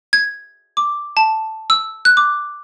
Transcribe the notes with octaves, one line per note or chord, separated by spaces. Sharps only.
G#6
D6
A5
E6
F#6
D6